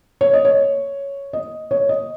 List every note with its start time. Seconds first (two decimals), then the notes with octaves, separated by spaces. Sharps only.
0.21 C#5
0.33 D#5
0.45 C#5
1.33 D#5
1.71 C#5
1.89 D#5